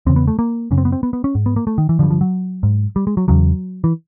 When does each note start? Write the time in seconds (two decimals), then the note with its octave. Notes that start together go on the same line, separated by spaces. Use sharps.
0.06 E2 C#3 C4
0.16 B3
0.27 A3
0.39 A#3
0.71 F#2 C#3 C#4
0.78 C4
0.85 B3
0.92 C4
1.03 B3
1.13 B3
1.24 C#4
1.35 G#2
1.46 B3
1.56 A#3
1.67 A3
1.78 D#3
1.89 E3
1.99 D3 F3
2.03 G2
2.10 F3
2.21 F#3
2.63 G#2
2.96 G3
3.07 G#3
3.17 F#3
3.28 E2 C#3 F#3
3.84 E3